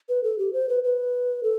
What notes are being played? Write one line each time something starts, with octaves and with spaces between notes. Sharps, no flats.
B4
A4
G4
C5
B4
B4
A4